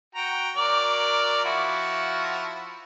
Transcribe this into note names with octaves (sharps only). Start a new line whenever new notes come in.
F#4 G5 A#5
F#3 A#4 D5
F3 E4 F#4